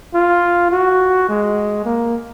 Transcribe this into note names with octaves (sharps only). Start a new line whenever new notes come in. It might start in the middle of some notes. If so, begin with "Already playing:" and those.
F4
F#4
G#3
A#3